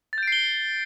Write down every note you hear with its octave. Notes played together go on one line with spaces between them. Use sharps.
G6 A6 C7 D7 G7